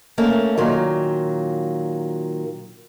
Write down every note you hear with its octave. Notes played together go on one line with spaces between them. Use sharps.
A3 A#3 C#4
A#2 D#3 F#3